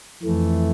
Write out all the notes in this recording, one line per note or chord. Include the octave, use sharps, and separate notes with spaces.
F2 E3 A3